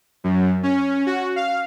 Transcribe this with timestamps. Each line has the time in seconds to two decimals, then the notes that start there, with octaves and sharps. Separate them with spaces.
0.24 F#2
0.63 C#4
1.06 F#4
1.36 F5